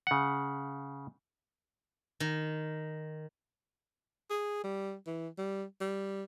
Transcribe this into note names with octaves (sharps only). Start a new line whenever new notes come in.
C#3 F#5
D#3
G#4
G3
E3
G3
G3